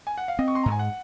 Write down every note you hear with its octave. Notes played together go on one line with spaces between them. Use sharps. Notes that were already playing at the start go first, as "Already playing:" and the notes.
G#5
F#5
F5
C4 D#5
C#6
C6
G#2 A#5
G#5
F#5